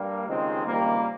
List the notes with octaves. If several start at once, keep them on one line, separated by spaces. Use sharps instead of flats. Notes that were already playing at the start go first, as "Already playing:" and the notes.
Already playing: G2 G3 A#3
C#2 C3 D#3 G#3 C4
C#2 C3 D#3 G3 A#3